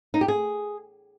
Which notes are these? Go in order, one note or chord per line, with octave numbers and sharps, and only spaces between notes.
D#4
G4
G#4